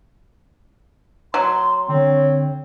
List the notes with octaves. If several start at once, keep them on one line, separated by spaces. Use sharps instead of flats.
F#3 C6
D3 C4 C#5